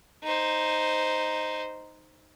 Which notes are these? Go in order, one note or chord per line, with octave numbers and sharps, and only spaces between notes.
D#4 C5